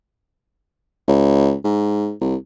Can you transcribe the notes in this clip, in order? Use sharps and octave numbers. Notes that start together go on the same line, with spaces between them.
C#2
G#2
C2